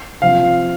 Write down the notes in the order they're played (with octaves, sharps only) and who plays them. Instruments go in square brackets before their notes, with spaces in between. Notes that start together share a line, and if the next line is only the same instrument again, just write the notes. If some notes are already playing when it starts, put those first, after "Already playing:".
[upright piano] C3 F3 [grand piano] F5